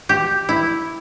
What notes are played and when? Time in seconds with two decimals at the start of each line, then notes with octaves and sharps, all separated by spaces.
0.09 G4
0.49 E4